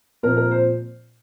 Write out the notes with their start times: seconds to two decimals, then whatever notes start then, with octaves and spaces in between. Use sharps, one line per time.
0.23 A#2 F3 C4 A#4
0.37 A#4
0.51 C5